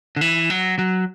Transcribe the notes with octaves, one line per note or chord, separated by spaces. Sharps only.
D3
E3
F#3
F#3